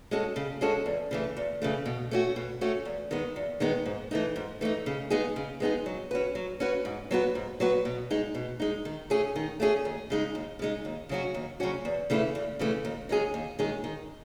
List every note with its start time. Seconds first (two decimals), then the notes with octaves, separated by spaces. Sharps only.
0.11 G#3 C#4 F#4 A4
0.36 C#3
0.61 G#3 C#4 F#4 A4
0.86 E2
1.11 C#3 E3 A3
1.37 E2
1.62 C#3 E3 A3
1.86 B2
2.11 A3 C#4 F#4
2.36 B2
2.61 A3 C#4 F#4
2.85 E2
3.11 D#3 G#3 B3
3.36 E2
3.60 D#3 G#3 B3
3.86 G#2
4.11 E3 A3 D#4
4.36 G#2
4.61 E3 A3 D#4
4.86 C#3
5.10 G#3 B3 D#4 G#4
5.36 C#3
5.60 G#3 B3 D#4 G#4
5.86 F#3
6.11 C#4 F#4 B4
6.35 F#3
6.60 C#4 F#4 B4
6.85 G#2
7.11 F#3 B3 F#4 B4
7.35 G#2
7.60 F#3 B3 F#4 B4
7.85 B2
8.10 G#3 D#4
8.35 B2
8.60 G#3 D#4
8.85 D#3
9.10 A3 C#4 G#4
9.36 D#3
9.60 A3 C#4 G#4
9.85 D#2
10.10 C#3 G#3 D#4
10.35 D#2
10.59 C#3 G#3 D#4
10.85 D#2
11.09 C#3 F#3 C#4 F#4
11.35 D#2
11.60 C#3 F#3 C#4 F#4
11.85 E2
12.10 C#3 E3 A3 E4
12.35 E2
12.59 C#3 E3 A3 E4
12.85 D#2
13.09 D#3 G#3 C#4 G#4
13.34 D#2
13.59 D#3 G#3 C#4 G#4
13.84 D#3